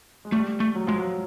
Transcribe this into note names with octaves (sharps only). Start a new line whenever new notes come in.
G#3
G3 A3
A3
F#3
F3 G#3
F#3